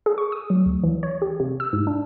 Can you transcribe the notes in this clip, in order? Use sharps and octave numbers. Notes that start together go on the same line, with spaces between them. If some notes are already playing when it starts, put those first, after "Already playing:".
G#4
C#6
D#6
F#3
D2
E3
C#5
G4
C3
E6
G#2
D4